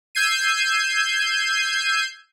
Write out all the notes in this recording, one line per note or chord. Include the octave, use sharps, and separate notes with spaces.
E6 G6 G#6 C7 D#7